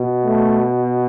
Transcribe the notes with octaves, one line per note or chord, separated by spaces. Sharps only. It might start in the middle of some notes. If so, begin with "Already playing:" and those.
Already playing: B2
A3